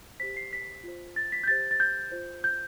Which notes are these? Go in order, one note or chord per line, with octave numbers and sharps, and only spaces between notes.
G4 C5 B6
C7
B6
F4 C5
A6
B6
G6
G4 C5 A6
A6
G6
F4 C5
G6